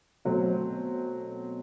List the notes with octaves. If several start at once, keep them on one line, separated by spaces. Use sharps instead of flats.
B2 F#3 A3 C4